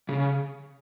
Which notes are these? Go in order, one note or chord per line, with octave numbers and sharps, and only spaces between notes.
C#3